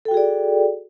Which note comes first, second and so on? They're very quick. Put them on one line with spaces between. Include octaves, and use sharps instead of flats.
A4 G5 F#4 G#4 D5